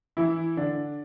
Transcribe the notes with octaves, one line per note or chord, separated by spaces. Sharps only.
E3 E4
D3 D4